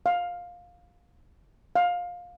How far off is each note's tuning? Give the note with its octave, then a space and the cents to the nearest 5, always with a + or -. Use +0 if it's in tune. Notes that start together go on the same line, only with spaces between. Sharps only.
F5 +15
F5 +20